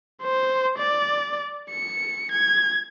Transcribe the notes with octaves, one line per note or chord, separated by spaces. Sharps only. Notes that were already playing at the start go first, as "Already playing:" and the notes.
C5
D5
C#7
G#6